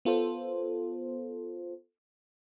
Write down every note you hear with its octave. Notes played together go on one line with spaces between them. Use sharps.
B3 F4 A4 C5